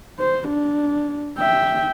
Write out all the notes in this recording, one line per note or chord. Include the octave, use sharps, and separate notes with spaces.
C5
D4
E5 G5